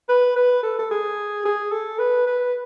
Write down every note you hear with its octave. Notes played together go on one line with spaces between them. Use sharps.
B4
B4
A4
A4
G#4
G#4
A4
B4
B4